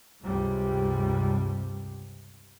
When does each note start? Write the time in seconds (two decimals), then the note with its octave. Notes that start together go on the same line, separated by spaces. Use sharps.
0.22 C#2 G2 C3 G3